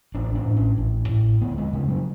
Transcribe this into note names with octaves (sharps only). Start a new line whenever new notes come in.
A1 D4
D4
A2
C#4
A1
A2
D2 B3
G#3
C#3 G3
F#3